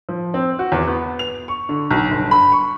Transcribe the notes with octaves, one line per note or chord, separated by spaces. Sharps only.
F3
C4
F#4
E2
B3
F7
C#6
D3
B1
G1
B5
C#6